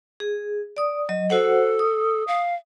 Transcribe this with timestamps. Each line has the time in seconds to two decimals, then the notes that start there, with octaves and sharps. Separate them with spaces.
0.20 G#4
0.77 D5 D#6
1.09 F#3 D#5
1.30 F#4 A4 C5 F#5
1.79 D#6
2.27 F5